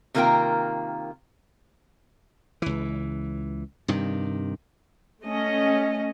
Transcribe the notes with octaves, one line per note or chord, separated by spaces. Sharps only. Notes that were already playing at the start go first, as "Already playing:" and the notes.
C3 D#3 A#3 F4 A#4 G5
C#2 E3
G2 C3 D#3
A3 C#4 D#5